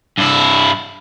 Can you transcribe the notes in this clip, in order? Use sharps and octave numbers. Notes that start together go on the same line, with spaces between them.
G2 E4